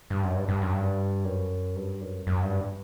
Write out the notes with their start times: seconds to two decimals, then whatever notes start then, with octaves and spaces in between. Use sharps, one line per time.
0.10 G2
0.23 F#2
0.36 G2
0.49 G2
0.62 F#2
0.74 G2
1.24 F#2
1.76 G2
2.01 F#2
2.27 F#2
2.43 G2